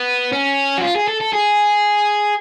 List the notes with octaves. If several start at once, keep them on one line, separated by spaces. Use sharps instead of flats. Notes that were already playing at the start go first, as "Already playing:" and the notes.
Already playing: B3
C#4
F#4
F4
G#4
A4
A4
G#4